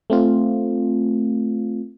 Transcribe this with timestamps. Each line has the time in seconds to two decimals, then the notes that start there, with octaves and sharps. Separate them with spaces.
0.10 A3 C4 F4